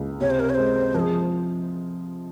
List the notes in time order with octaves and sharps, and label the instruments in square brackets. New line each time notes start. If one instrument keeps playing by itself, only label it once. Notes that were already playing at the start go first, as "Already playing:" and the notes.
Already playing: [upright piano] C#2
[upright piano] C3 [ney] C#5
[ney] C5
A#4
C#5
[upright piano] G#3 [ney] C5
[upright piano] F3 [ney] A#4
[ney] G#4